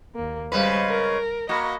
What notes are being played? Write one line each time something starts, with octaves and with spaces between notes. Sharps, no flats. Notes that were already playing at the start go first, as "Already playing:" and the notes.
D#2 A#3
C#3 G3 G#3 B4 C5 F5
A#4
A#3 F#4 D#5 B5